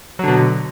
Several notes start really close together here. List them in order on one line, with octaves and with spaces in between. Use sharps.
F#3 D3 B2